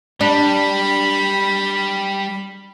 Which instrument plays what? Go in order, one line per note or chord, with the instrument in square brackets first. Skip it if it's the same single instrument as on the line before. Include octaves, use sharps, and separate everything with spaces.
[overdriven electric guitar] G3 [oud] D4 [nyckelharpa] B5